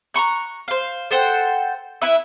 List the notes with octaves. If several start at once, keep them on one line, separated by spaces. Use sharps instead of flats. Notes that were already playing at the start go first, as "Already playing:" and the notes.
A#5 C6 C#6 F#6
C5 F5
A4 C5 F#5 G5
E4 B4 E5